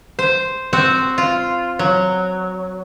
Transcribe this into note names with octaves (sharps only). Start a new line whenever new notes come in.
C5
C4 F#4 C5
F4
F#3